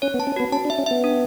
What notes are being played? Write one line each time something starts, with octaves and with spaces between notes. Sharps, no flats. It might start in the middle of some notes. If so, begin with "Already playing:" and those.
C#4 C#5
B3
A5
C#4
B3 F#4
C#4 A5
D4
E5
C#4
B3 E5
D4